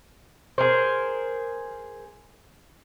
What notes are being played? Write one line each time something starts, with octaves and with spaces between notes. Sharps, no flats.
G#4 A#4 C5